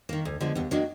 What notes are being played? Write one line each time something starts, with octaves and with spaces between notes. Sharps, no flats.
D#3 A#3
D2
D3 F3 G#3 B3
D#2 B3
D#3 F#3 A#3 D4